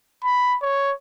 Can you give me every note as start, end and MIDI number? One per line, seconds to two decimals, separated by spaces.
0.23 0.56 83
0.62 0.92 73